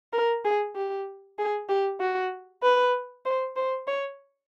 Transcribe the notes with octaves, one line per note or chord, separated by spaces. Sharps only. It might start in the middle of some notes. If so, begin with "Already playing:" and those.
A#4
G#4
G4
G#4
G4
F#4
B4
C5
C5
C#5